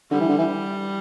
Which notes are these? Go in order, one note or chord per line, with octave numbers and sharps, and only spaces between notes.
D3 G3
E3
D3
E3